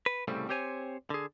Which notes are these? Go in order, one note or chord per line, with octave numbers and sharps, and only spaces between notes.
B4
C2 A2 C#3 G3 A3 C4
C4 G4 C5 C#5 G#5
D3 G#4